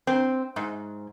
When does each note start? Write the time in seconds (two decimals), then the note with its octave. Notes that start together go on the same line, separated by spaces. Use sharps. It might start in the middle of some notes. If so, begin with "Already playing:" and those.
0.07 C4
0.56 G#2